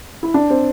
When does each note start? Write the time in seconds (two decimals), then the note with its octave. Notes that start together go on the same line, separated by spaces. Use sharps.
0.23 E4
0.34 D4
0.50 C4